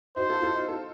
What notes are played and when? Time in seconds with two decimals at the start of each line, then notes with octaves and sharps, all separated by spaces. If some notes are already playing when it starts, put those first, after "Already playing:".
0.16 D#4 F#4 C5
0.30 F4 A4
0.42 F4 A4
0.55 D#4 F#4
0.68 A4 C5